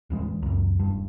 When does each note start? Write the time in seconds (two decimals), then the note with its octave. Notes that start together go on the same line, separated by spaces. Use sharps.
0.10 D1 E2 G#3
0.42 C#2 F#2
0.79 E1 G2